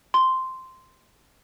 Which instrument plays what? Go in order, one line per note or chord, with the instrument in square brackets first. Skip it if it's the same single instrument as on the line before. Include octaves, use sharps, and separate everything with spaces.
[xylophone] C6